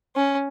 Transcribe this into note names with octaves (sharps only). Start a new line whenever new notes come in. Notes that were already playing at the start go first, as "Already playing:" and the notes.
C#4